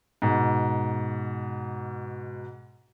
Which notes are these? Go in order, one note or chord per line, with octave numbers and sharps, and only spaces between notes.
G#2 B2